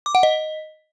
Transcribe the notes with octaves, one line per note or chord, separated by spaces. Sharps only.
D6
F#5
D#5